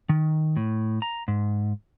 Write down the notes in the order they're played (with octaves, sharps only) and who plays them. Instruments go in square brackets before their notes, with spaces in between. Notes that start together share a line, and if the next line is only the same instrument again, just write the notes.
[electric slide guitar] D#3
A2
A#5
G#2